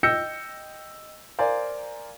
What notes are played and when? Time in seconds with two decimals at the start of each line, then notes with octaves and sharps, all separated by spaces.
0.03 D#5 G5 E6 G6 A#6 C#7
1.39 A#4 C5 D5 F5 G#5